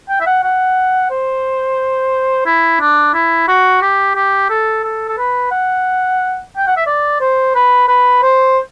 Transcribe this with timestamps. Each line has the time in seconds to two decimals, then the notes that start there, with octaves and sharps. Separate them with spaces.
0.09 G5
0.20 E5
0.26 F#5
0.43 F#5
1.11 C5
2.46 E4
2.80 D4
3.14 E4
3.48 F#4
3.82 G4
4.15 G4
4.50 A4
4.84 A4
5.09 A4
5.18 B4
5.51 F#5
6.57 G5
6.67 F#5
6.77 E5
6.87 D5
7.20 C5
7.55 B4
7.88 B4
8.23 C5